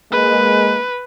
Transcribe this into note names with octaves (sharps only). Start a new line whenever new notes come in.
G#3 A#3 B4